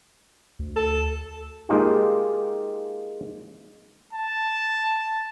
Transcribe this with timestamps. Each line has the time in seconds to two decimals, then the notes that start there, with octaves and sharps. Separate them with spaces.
0.59 D2
0.76 A4
1.69 G#3 A#3 D#4 F4 G4
4.13 A5